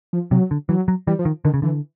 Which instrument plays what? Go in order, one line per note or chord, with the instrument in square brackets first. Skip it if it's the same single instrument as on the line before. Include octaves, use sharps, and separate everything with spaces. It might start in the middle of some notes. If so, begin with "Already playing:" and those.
[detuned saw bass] F3
[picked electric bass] C3 [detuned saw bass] F#3
[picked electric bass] D3
[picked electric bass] E3 [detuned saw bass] F#3
[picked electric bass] F#3
[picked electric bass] E3 [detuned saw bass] G3
[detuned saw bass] F3
[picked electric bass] D#3
[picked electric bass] D3 [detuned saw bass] D#3
[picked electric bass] C#3
[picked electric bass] D3 [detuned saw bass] E3